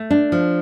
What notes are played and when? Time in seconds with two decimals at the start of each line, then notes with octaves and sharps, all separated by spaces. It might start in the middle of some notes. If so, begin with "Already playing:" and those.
Already playing: A3
0.10 D4
0.32 F3